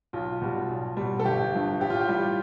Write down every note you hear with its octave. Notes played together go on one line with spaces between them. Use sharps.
B1 F4
B2 G3
B1
B2 G3
A4
G1 G4
G2 F3
A1 G4
F4
G4
A2 G3